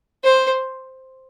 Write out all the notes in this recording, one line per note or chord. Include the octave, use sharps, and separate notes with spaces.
C5